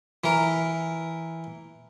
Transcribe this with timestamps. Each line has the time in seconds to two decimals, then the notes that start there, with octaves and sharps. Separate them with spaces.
0.24 E3 A#4